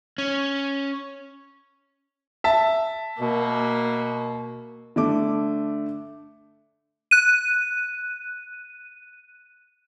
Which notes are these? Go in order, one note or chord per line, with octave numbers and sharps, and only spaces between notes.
C#4
E5 A5
B2 A#3
D3 A3 D6
F#6 D#7